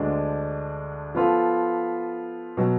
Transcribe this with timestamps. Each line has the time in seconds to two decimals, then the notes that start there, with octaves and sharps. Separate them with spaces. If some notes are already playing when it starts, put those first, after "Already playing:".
Already playing: D2 D3 G#3 D4
1.15 F3 B3 F4 A4
2.57 B2 F#3